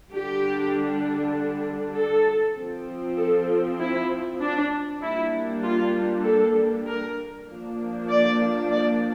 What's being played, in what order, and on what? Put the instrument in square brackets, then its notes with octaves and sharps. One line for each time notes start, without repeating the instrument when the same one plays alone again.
[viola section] D3 G3 D4 G4
A4
F3 C4
A4
E4
D4
G3 A#3 D4 E4
F4
A4
A#4
F3 A#3 D4
D5
D5